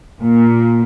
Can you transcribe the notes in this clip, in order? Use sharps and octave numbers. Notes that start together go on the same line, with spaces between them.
A#2